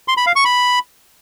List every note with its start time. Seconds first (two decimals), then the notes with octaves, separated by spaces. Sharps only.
0.08 C6
0.17 B5
0.26 F5
0.36 C#6
0.45 B5